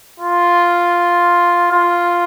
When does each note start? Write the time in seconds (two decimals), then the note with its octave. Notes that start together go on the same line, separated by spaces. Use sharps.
0.20 F4
1.72 F4